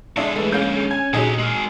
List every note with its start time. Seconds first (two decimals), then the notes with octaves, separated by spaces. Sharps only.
0.16 D3 G#3 D4 E4 G#4
0.36 E3 G#3 A3
0.52 A#3 C#4 G6
0.91 G#5 G#6
1.13 A#2 D3 F#3 D#4 G4 G#4
1.39 G#3 A#4